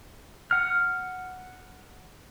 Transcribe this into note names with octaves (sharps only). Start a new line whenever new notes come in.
F#5 F6